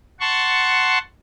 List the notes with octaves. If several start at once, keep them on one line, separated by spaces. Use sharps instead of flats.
F#5 A5 C6 C#6